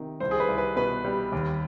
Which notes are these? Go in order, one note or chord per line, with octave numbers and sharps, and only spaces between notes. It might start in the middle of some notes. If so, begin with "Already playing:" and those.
Already playing: C3 D#3
C2 C5
G#4
B4
C2
B4
B2 B4
G3
D#2